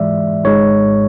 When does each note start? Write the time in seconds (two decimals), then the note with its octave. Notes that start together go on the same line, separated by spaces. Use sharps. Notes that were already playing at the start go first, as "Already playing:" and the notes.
Already playing: G#2 E3 G#3 D5 E5
0.44 G#1 G#2 G#3 C#5